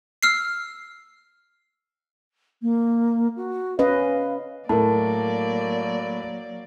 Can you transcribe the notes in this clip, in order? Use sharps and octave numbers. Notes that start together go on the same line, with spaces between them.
E6 F6 C7
A#3
F#4
C#4 B4 D#5 F5
A2 F#3 A#3 A#4 D5 A5